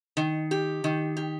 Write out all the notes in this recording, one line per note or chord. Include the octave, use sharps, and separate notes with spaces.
D#3
G4
D#3
G4